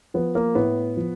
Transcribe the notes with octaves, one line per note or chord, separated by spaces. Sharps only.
F3 B3
A#3
A2 B3
F3